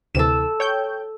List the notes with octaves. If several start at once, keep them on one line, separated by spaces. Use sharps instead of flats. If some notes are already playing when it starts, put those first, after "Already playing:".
D2 C3 E3 A4 E7
C#5 G5 G6